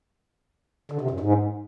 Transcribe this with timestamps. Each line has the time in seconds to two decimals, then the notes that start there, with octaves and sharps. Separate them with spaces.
0.92 D3
1.01 C3
1.11 F#2
1.20 G#2